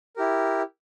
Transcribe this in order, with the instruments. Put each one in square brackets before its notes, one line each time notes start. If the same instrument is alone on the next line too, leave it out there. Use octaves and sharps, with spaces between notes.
[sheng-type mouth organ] E4 G4 A#4